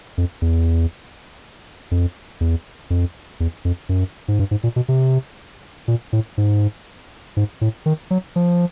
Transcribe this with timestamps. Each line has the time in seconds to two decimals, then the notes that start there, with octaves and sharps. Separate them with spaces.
0.18 F2
0.42 E2
1.91 F2
2.41 E2
2.90 F2
3.40 E2
3.65 F2
3.89 F#2
4.28 G#2
4.39 G2
4.51 G#2
4.63 A#2
4.76 B2
4.88 C3
5.88 A#2
6.13 A2
6.38 G#2
7.37 G#2
7.61 A2
7.86 D#3
8.11 F#3
8.36 F3